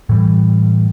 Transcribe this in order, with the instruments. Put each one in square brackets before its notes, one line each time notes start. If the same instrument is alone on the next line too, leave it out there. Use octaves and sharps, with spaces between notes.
[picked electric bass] A2 E3 G3